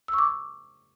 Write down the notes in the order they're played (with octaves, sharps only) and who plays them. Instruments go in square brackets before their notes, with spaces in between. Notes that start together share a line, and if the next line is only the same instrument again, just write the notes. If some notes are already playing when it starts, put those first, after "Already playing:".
[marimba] E6
C#6
D6